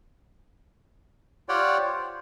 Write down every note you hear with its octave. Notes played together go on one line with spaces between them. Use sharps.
F4 G4 C#5 D5 F#5 G5
C5